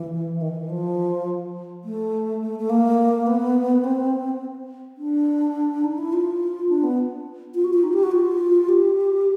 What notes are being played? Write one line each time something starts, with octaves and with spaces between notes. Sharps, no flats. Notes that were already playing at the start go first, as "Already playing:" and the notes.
Already playing: E3
D#3
E3
F3
A3
A3
A3
A#3
B3
C4
D4
D#4
E4
F4
D4
B3
F4
F#4
F4
D#4
G4
F#4
F4
G4